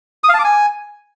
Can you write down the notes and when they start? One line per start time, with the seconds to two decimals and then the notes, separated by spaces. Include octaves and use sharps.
0.24 D#6
0.29 F5
0.34 A5
0.39 D6
0.44 G#5